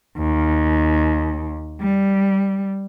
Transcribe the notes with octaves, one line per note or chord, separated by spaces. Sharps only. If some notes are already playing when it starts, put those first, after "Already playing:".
D#2
G3